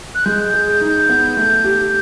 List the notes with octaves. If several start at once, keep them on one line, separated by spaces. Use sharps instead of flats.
F#6
G#3 G6
G#4
D#4
B3
A3
G4